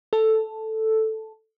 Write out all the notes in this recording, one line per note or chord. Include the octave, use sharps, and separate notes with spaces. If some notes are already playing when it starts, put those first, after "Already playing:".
A4